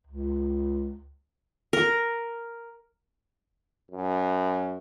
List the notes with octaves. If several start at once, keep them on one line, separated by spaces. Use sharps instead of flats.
C#2
A#4
F#2